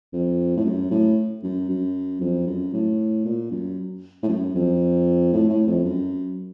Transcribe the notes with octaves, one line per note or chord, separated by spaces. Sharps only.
F2
A2
F#2
A2
F#2
F#2
F2
F#2
A2
A#2
F#2
A2
F#2
F2
A2
A2
F2
F#2